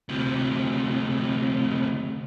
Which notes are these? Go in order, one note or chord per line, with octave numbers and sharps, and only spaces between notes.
D2 C3